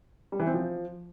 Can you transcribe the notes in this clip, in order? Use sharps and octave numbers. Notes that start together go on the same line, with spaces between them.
G3
E3
C4
F3